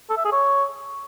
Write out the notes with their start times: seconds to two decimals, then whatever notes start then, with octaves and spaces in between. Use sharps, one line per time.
0.10 A4
0.17 E5
0.25 G#4
0.32 C#5